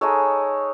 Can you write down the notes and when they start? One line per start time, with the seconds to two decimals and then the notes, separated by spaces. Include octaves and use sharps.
0.01 G#3 D#4 A4 C#5